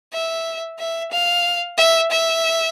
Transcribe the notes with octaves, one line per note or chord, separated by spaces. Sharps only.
E5
E5
F5
E5
E5